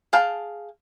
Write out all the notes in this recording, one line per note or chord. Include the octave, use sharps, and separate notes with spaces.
G#4 F5 G5 A5